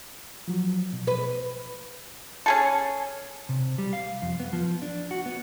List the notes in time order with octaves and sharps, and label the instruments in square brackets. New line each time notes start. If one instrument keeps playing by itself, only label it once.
[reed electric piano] F3 F#3
B2
[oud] B4
[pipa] C#4 G#4 A4
[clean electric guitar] C3
G3
F5
F2
B3
F3
D4
F#4
B3